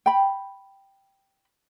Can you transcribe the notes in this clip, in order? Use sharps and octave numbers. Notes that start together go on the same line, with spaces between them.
G5 B5